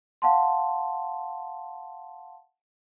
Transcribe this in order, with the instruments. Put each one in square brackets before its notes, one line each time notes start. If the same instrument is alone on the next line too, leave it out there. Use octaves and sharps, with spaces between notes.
[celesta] F5 F#5 A5 C6